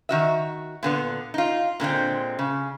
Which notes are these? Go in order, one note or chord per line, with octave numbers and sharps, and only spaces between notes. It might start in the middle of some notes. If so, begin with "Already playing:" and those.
D#3 F#4 E5
A#2 D3 B3
D#4 F4
A#2 D3 G#3 C4
C#3